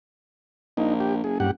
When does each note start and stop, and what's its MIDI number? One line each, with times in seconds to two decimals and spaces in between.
0.77 1.19 34
0.77 0.94 63
1.00 1.15 67
1.24 1.48 30
1.24 1.38 68
1.40 1.51 43
1.40 1.51 67
1.40 1.51 78